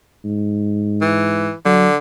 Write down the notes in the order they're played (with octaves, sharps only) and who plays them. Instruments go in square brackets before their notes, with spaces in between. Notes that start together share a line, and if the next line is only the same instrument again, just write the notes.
[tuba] G#2
[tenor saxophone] E3
[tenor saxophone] D3 [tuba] F#3